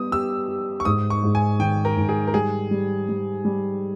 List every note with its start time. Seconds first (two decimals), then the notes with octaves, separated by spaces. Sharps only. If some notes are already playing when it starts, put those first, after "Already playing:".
Already playing: G3 B3 D#6
0.12 G4 E6
0.48 G4
0.80 C#6
0.85 G#2 D#6
1.10 C#6
1.23 G#2
1.35 G#5
1.59 D#3 G5
1.85 A#4
1.97 G#2
2.09 G#4
2.27 A#4
2.34 G3 G#4
2.71 G3
3.09 G3
3.45 G3